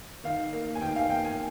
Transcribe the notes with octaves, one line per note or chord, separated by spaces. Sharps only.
D#3 F5
A#3
G#5
D#3 G5
F5
A#3 G5
G#5